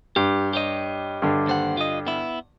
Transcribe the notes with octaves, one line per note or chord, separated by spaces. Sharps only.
G2 G4
G4 C#5 D#5
G2 D3
D#2 C5 F#5
F4 D#5
B3 E4